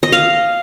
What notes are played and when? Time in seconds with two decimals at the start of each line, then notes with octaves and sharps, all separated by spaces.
0.03 D#5
0.12 F5